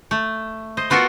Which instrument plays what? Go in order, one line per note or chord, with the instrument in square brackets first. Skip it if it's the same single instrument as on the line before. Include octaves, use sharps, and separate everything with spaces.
[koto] A3
C5 D#5
B3 F4 F#4 A4 A#4